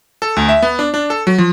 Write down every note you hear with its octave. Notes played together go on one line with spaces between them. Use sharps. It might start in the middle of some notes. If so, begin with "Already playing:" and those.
A4
D2
E5
B3
D4
D4
A4
F#3
F3